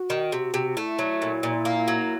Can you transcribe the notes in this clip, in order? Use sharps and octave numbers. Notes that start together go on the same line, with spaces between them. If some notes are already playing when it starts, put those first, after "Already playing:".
Already playing: F#4
D#3
C3
C3
A3 E4
F#3
A#2
A#2
A#3
F#3